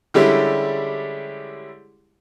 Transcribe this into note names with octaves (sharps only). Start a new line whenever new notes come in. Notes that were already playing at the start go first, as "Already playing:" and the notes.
D3 G3 G#3 C#4 E4 G4